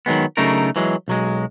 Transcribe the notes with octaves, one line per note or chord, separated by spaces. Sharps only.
D#3 F#3 G#3 B3
C#3 F#3 A3 D4 D#4 A#4
E3 F#3 G#3
B1 F#3 G#3